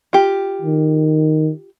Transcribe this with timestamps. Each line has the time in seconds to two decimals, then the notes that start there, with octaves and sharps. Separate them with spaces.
0.13 F4 G4
0.62 D#3